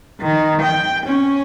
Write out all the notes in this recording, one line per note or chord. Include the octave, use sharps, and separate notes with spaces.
D#3
G5
C#4